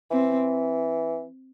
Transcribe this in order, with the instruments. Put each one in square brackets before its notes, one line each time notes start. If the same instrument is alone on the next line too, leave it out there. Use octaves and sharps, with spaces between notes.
[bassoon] E3 [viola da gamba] C4